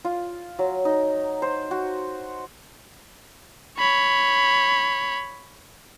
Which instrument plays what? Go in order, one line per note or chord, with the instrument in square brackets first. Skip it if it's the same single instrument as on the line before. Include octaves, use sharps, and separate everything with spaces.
[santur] F4
F#3
D#4
C5
F#4
[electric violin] C#5 B5